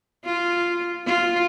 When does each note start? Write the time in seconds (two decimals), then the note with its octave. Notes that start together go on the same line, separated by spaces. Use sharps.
0.25 F4
1.05 F4